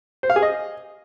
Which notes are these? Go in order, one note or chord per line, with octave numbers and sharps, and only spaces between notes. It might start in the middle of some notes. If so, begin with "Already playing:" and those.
C5
F5
G#4
D#5